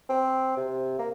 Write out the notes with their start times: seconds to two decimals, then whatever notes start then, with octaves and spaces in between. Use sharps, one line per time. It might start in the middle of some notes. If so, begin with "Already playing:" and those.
0.09 C4
0.57 C3
0.99 A#3